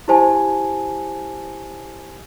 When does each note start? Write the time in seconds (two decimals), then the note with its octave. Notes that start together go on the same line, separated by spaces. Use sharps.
0.08 E4 G4 C5 G#5 A5